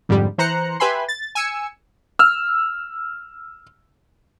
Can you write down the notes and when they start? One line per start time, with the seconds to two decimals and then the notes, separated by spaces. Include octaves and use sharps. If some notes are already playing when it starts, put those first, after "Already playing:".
0.09 F2 G#2 D3 G3
0.38 E3 C5 A#5 F#6 C#7
0.80 G4 B4 E5 G#5 B5 C6
1.08 A6
1.35 G#5 E6 C#7
2.19 E6 F6